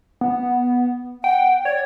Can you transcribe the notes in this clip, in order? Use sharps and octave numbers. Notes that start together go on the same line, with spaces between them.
B3
F#5 G5
C#5 D5